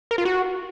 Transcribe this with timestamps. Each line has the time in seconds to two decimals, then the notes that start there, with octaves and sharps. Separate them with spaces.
0.11 A#4
0.18 F4
0.25 F#4